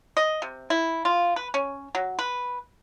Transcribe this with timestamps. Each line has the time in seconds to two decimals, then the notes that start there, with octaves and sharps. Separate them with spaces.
0.17 D#5
0.42 C3
0.70 E4
1.05 F4
1.36 B4
1.54 C#4
1.95 F#3
2.19 B4